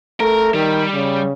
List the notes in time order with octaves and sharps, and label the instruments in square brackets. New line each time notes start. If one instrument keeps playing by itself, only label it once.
[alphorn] A3 [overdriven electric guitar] A#4
[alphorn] D#3 [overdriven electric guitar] G3
[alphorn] C#3